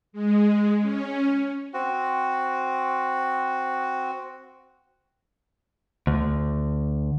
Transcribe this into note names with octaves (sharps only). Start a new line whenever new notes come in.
G#3
C#4
C4 F#4
D2